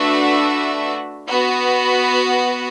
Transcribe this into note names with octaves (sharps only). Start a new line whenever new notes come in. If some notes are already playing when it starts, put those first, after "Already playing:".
Already playing: A3 D4 F#4 B4 E5
B3 F#4 B4